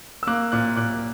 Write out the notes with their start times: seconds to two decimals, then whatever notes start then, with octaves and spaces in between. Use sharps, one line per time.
0.23 E6
0.27 A#3 D6 F#6
0.52 A#2 D6 F#6
0.76 A#2 D6 F#6